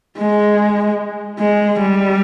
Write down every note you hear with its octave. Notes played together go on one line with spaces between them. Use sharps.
G#3
G#3
G3